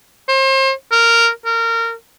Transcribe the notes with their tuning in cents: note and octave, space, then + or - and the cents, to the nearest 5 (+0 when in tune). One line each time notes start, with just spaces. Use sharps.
C5 +35
A#4 -10
A#4 -25